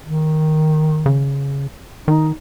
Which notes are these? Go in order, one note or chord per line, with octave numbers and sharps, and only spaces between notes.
D#3
C#3
D#3 D#4